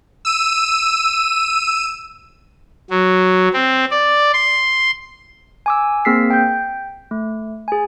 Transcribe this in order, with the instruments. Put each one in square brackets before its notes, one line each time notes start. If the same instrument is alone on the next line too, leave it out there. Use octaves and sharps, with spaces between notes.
[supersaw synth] E6 D#7
[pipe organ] F#3
C4
D5
C6
[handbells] G#5 D6 E6
A#3 C4 G#4 E6 B6 C7
G5 G6
A3
G#4 G#5